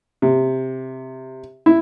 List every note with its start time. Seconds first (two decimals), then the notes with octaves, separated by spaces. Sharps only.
0.22 C3
1.66 E4